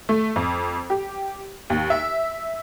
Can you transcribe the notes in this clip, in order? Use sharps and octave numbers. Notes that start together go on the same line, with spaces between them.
A3
F2
G4
D#2
E5